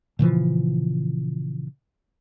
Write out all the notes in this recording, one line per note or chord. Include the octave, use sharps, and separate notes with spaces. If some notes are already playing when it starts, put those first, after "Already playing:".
A#2 C#3 E3 F3